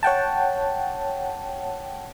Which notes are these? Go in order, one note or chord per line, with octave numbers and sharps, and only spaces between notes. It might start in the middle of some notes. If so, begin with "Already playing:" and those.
C#5 F#5 G5 A5